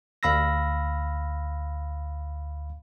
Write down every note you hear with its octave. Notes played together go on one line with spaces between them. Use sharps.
D2 F5 B5 E6 A#6